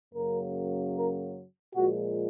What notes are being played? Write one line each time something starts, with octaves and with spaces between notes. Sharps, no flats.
F#2 C#3 F#3 A#3 A#4
A#4
A#2 F3 G#3 F#4